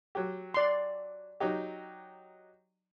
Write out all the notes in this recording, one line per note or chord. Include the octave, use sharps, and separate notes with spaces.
F#3 G4
D5 C6
F#3 D#4 G4